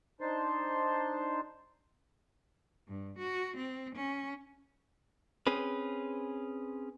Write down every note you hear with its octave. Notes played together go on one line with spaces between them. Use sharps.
D4 D#4 C5 A5 C6
G2
F#4
C4
C#4
C4 C#4 G#4 B4